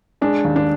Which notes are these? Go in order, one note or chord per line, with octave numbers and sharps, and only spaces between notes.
G#3 D4
D#2
D4